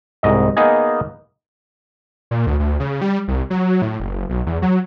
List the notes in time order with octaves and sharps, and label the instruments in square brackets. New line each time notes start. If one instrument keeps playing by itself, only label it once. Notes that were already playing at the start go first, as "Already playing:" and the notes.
[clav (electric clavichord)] C2 G#2 D#5
A#3 B3 D#4 G#4 D#5 G#5
[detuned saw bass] A#2
D2
D2
C#3
G3
C2
F#3
A2
F#1
B1
E2
F#3